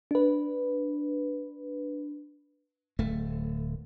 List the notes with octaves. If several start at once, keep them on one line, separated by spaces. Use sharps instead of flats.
D4 B4
D1 A3